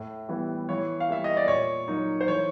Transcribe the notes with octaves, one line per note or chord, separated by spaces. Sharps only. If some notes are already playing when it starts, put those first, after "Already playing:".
Already playing: A2
E3 G3 B3
E3 C#5
F5
G3 A#3 E5
D#5
D5
A#2 C#5
F#3 A#3 D#4
C5
E3 C#5